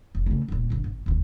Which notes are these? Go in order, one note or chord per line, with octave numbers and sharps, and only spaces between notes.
F1
C#3 A3
D1 A#2
G#1 D3
G#1
E1 D2